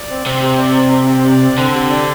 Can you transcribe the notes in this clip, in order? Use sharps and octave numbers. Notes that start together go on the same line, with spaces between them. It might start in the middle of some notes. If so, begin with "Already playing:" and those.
Already playing: D5
C4
C3 C4
G4
D5
C4
C4
G4
D5
C4
D3 C4
G4
D5